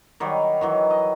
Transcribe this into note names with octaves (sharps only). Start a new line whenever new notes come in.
D#3 F#3 G3
D#3 E3 F#3
D#5